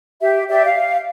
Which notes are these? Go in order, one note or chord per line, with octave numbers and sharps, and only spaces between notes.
G4 E5
G4 D5 E5
F5